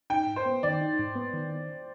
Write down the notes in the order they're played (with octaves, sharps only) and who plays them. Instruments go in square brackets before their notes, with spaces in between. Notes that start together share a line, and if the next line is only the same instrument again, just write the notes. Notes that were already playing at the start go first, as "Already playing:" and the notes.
[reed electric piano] D#4 [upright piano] G5
[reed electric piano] G#2
[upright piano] C5
[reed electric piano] B3
[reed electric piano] D#3 [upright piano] D5
[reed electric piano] D#4
G#2
B3
D#3